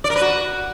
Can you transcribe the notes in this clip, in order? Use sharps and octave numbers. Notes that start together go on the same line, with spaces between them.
D5
A#4
B4
F#4